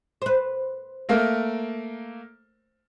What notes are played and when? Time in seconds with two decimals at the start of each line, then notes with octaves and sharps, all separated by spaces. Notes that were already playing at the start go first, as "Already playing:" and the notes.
0.22 B4 C5
1.09 A3 A#3 A#4